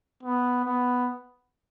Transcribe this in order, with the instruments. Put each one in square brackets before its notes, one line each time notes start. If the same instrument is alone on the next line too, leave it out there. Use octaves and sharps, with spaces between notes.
[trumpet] B3
B3